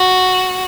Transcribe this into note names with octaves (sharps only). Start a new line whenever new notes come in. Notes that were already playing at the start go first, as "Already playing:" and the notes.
Already playing: F#4